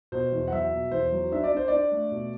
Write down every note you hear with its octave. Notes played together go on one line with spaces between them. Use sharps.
B2 C5
E2
F#5
F#3 E5
B2
E2 C5
F#3
D4 E5
D5
D4 C5
D4 D5
A3
B2